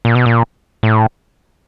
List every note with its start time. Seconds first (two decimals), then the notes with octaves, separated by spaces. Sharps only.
0.05 A#2
0.15 B2
0.26 A#2
0.83 A2